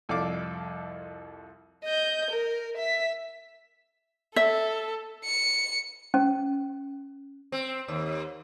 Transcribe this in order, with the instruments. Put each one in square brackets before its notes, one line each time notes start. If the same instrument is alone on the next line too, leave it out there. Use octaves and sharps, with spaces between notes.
[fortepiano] C2 F2 A4 D5 F5 D6
[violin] D#5 G6
A#4
E5 B6
[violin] A4 [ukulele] E5
[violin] C#7
[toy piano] C#4
[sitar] C4
D#2